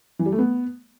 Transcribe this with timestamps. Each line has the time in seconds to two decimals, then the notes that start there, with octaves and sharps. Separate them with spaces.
0.19 E3
0.26 G3
0.32 A3
0.39 B3